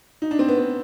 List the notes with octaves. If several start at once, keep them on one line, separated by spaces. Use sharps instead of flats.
D#4
D4
C4
B3
C4